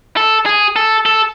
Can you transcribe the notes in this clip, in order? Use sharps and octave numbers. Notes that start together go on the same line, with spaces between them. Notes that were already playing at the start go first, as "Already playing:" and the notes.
A4
G#4
A4
A4